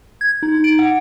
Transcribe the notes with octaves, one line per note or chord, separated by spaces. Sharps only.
G#6
D#4
D7
F#5